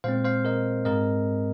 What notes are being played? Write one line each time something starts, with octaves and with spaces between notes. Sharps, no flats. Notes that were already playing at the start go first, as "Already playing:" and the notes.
A#2 G#3 C4 C5 F5
C5 F5
A#4 D#5
G#2 G#3 C4 A#4 D#5